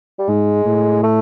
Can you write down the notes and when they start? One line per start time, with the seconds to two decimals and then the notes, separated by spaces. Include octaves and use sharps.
0.19 G3
0.28 G#2 G#3
0.65 A2
1.03 A3